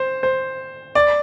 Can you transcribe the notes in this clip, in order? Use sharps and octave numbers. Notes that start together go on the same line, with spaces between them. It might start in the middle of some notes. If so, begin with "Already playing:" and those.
Already playing: C5
C5
D5